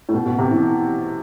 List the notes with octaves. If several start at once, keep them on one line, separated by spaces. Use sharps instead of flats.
A2
B2
B2
C3
E3